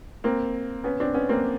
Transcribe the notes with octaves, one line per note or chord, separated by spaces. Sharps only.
A#3 C4
B3 C#4
C4 D4
B3 C#4
A#3 C4